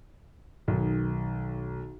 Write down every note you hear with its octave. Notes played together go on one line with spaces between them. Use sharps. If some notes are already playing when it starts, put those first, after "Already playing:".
B1 D#3